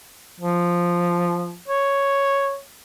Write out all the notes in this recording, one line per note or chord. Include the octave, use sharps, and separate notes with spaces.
F3
C#5